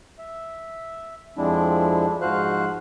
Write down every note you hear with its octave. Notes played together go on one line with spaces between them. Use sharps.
E5
F2 F3 G#3 C4 D4 E4
G#2 F3 F#4 C5 F5 F#6